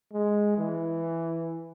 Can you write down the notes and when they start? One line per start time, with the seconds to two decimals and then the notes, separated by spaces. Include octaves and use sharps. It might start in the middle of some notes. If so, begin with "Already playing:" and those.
0.13 G#3
0.58 E3